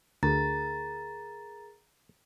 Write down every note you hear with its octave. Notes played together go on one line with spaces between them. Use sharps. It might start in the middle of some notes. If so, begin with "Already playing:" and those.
D2 G#4 A#4 A#5 A6